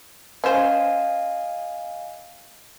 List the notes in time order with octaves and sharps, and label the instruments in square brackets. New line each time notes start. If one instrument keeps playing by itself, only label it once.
[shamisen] C#4 C5 [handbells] D#5 F5 G#5